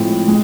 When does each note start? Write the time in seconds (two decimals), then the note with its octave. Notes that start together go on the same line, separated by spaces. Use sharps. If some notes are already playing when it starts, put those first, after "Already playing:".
Already playing: A2 F3 G#3 C4
0.28 G#3